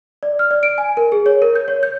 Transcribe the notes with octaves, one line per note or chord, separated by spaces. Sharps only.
D5
F6
D5
D7
G#5
A#4
G#4
C#5
A#4
G6
C#5
G6